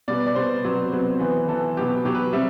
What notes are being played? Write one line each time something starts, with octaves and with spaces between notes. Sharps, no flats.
B2 G3 B3 D5
D5
B2 G3 B3 C5
C3 F#3 B3
C3 F#3 B3
E3 B3
E3 B3 A4
B2 F#3 B3 G4
B2 F#3 B3 G4
B4
C3 G3 C4 E5